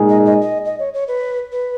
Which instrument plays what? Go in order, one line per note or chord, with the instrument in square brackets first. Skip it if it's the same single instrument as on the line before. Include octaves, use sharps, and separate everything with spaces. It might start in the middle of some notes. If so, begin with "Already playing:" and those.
Already playing: [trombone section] A#2 G#3 D#4 G#4
[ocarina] D#5
D#5
D#5
D#5
C#5
C#5
B4
B4